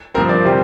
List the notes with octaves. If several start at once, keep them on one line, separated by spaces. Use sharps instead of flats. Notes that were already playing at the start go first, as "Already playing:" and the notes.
G2 F3 C4 A#4
D5
C3 G3 C4